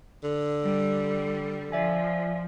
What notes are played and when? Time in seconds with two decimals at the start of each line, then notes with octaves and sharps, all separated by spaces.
0.24 D3
0.65 G3
1.72 F3 D5 E5 G#5